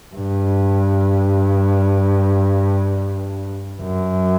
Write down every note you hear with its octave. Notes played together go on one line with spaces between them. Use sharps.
G2
F#2